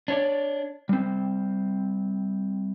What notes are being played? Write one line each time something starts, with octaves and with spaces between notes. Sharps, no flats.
D4 C#5 D5
G3 C4